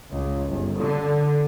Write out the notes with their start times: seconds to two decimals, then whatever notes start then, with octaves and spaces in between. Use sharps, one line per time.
0.11 C#2
0.47 G1
0.78 D3